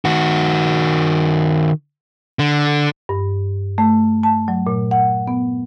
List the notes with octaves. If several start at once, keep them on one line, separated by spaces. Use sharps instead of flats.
D#3 F#4
D3
G2
A3
A5
F#3
A#2
F#5
B3